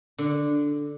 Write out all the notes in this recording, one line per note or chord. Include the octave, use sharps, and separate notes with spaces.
D3